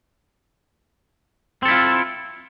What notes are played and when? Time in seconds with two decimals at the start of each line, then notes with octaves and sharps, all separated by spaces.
1.63 C4
1.65 A4
1.68 E4
1.71 F4